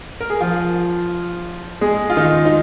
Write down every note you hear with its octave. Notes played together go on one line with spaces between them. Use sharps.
A#4
G#4
F3 F4
G#3 G#4
F4
D#3 D#4
D#4